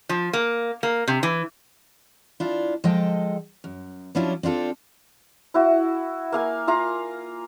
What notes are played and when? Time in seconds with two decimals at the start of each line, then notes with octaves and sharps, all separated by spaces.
0.09 F3
0.33 A#3
0.83 A#3
1.08 C3
1.23 E3
2.40 D4 E4 F4
2.84 F3 G#3 A4 D#5 G5 A5
3.64 F#2
4.15 F3 F#3 C#4 D4 E4 F4
4.43 C4 D4 F4 A4
5.54 E4 F#4
6.32 A#3 F5 G#5
6.68 F4 F5 A#5